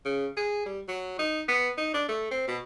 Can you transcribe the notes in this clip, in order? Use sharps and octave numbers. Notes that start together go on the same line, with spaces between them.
C#3
G#4
G3
F#3
D#4
B3
D#4
D4
A3
C4
B2